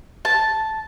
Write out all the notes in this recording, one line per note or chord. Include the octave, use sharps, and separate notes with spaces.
A5